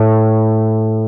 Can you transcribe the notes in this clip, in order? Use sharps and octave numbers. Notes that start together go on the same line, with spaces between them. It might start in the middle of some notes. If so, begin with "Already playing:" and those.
Already playing: A2